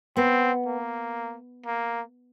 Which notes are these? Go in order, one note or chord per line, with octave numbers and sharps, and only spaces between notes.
B3 C4
A#3
A#3